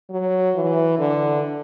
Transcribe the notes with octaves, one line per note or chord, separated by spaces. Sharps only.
F#3
E3
D3